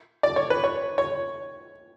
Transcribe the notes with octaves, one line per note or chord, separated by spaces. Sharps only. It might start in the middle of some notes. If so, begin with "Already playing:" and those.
D5
C#5
B4
C#5
C#5